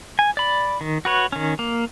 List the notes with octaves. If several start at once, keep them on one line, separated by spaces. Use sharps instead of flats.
G#5
D5 B5
D#3
F#4 B4 C#5
D#3 C#4
A#3